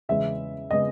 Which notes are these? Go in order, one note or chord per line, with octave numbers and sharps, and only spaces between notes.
E2 C#3 G#3 B3 E5
C#3 G#3 B3 D#5